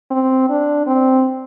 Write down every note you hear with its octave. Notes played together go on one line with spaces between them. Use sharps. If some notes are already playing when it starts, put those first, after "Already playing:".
C4
D4
C4